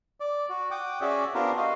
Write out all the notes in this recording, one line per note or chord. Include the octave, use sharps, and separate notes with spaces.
D5
F#4
F#5 G5 D6 D#6
C#4 F#4 G#4 D5 E5
B3 C4 D4 F4 G4 A#4
F#4 D#5 F5